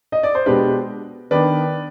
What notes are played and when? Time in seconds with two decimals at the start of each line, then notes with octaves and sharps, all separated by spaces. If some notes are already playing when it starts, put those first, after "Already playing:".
0.12 D#5
0.23 D5
0.35 C5
0.46 B2 G#3 D4 G4 B4
1.31 D#3 B3 D4 B4 D5